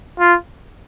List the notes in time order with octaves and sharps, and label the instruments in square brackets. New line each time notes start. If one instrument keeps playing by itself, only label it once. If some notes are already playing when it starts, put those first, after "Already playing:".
[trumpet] F4